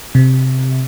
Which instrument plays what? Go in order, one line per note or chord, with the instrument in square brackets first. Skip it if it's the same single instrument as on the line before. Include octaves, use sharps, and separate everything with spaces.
[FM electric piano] C3